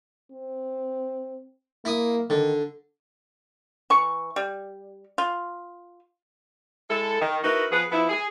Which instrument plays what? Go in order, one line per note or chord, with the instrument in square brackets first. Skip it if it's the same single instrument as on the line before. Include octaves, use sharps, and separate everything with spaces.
[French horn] C4
[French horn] A#3 [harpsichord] E4 D#6
[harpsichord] D3 [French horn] D#3
[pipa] E3 C#6
G3
F4
[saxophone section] G#3 E4 A4
D#3
D#4 E4 F#4 A#4 B4
F3 B3 G#4 B4
F3 B3 E4
G#4